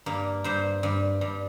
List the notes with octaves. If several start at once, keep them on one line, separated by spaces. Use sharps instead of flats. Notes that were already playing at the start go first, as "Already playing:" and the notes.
G2 A#3
G2 C5
G2
G2